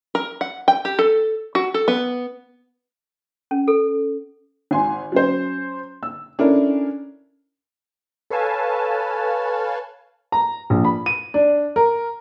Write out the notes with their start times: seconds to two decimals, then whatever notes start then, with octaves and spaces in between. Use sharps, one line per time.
0.15 A#4
0.41 F#5
0.68 G5
0.85 G4
0.99 A4
1.55 F#4
1.74 A4
1.88 B3
3.51 C#4
3.68 A4
4.71 G#1 G#5 C6
5.12 F#3 C#4 C5
6.03 E6
6.39 C#4 D4 E4 A4 A#4
8.30 A4 B4 C#5 F5 G#5 A5
10.32 A#5
10.70 A#1
10.85 B5
11.06 D#7
11.34 D4
11.76 A#4